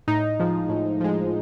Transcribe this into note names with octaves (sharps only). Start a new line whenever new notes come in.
A2 D#4
F3 G#3
A2
F3 G#3